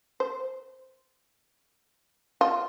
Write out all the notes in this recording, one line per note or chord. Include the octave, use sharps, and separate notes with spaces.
C5
F4